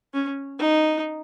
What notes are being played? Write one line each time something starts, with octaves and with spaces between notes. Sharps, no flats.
C#4
D#4